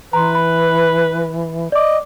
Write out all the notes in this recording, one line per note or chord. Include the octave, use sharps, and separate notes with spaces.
E3 B4 A#5 C6
B5
D5 D#5 D6